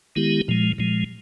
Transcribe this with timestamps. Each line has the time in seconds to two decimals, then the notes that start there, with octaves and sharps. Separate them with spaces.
0.16 D#3 G#3 B3 E4 G4
0.48 A#2 F3 G#3
0.78 A#2 F3 G#3